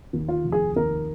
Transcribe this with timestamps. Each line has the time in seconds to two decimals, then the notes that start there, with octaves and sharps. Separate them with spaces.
0.13 D#2
0.28 F4
0.44 F1
0.52 G#4
0.76 D#2 A#4